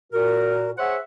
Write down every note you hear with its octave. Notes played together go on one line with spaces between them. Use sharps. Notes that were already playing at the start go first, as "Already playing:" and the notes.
A#2 F#4 A#4
G#4 C5 C#5 E5 F#5